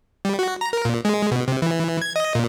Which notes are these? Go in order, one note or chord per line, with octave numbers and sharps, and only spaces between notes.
G3
F#4
A#5
A#4
A#2
G#3
B2
C3
E3
G#6
D#5
A#2